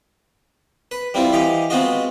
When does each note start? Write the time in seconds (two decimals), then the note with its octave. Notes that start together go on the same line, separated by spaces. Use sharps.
0.91 B4
1.14 G3 C4 E4 F4
1.33 E3 G4 D#5 F5
1.70 G#3 B3 C4 F4 F#4 D#5